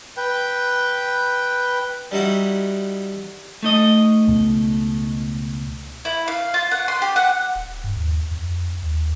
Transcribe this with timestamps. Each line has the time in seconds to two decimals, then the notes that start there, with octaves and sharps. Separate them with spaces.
0.17 B4 G5
2.11 G3 D#4 E4 F#4
3.63 A3 D#4 D#5
4.28 C#2 B2
6.05 E4
6.28 F5
6.54 F4
6.71 F#5
6.88 C6
7.02 G4
7.16 F#5
7.56 D1
7.84 G2
7.96 D#2
8.31 F2
8.82 D#2